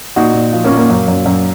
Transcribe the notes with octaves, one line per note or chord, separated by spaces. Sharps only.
A#2 D#4 F#4
A#2
F3
A#3 C#4
A#2
A#3
F#2
F#2
F#2